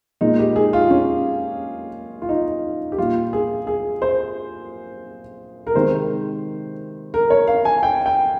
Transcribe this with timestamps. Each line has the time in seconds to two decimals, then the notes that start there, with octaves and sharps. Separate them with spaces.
0.21 A#2 G#3 D#4
0.39 G4
0.56 G#4
0.73 F4
0.90 C#4
2.22 F4
2.29 D#4
2.92 G4
2.98 A#2 G3 F4
3.33 G#4
3.67 G#4
4.02 C5
5.67 A#4
5.75 C3 D#3 G#3 C5
7.14 A#4
7.30 C#5
7.47 F5
7.65 G#5
7.83 G5
8.06 G5